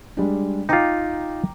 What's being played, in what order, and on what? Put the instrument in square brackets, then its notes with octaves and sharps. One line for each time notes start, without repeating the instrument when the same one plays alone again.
[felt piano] G3 G#3 D4
[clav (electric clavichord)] D#4 F4 [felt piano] G5 A#5 D6